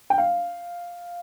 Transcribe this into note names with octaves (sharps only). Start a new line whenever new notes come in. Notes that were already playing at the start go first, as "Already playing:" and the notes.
G5
F5